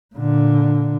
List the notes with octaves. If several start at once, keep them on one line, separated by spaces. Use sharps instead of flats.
A#2 D3